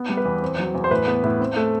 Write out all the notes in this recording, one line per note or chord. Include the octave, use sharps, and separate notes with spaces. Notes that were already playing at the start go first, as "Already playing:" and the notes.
Already playing: B3
G3
B4
E2
C4
F#3
E2
C5
A2 B4
B3
A2
C4
A3